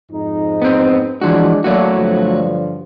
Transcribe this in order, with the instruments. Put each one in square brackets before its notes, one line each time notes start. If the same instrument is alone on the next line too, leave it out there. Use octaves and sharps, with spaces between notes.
[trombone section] F2 G#2 D#4
[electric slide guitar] B3 C4
[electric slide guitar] E3 F3 F#4 [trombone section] G#3 D4
[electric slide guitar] F#3 A3 F#4 [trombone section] A#3 D4
[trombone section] G2 D3 F3